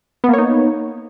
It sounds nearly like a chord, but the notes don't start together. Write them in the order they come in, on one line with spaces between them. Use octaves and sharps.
B3 A#3 C#5 D#4